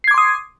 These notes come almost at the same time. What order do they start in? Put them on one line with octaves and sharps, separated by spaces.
C7 G#6 D6 C6 D#6